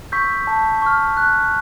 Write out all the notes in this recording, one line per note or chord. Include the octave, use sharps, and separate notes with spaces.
C#6 E6 G6 B6
A5
C#6 F6
F#6